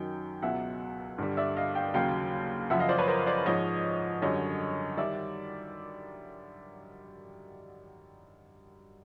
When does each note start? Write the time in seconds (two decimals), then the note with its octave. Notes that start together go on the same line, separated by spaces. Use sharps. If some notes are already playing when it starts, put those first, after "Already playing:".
Already playing: F#2 D#3 F#3 G5
0.42 C#2 B2 F#3 E5 F#5
1.18 G2 D3 G3
1.37 D5 E5
1.57 D#5 F5
1.75 F5 G5
1.94 D#2 C#3 F#3 F5 G5
2.70 F#2 C#3 F3 E5 F#5
2.79 D#5 F5
2.89 C5 D5
2.98 B4 C#5
3.08 A#4 C5
3.27 C5 D5
3.45 G#2 F3 C#5 D#5
4.22 F#2 D3 G3 C#5 D#5
4.97 D#3 G3 D5 E5